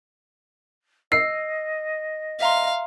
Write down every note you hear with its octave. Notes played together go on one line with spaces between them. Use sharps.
D#5 E6 C7
E5 F5 A#5 C6